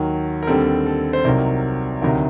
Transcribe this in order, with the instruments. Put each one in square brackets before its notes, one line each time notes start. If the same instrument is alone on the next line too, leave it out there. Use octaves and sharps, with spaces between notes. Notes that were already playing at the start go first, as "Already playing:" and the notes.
Already playing: [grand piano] D#2 D#3 F#3
A#4
D#2 D3 G3 C4 A4
A4
C5
C2 C3 D#3 F#3 A#4
D2 C3 D#3 F#3 A#4